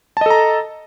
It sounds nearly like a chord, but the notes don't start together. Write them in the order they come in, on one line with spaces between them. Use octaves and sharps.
A5 D#5 A4 A#5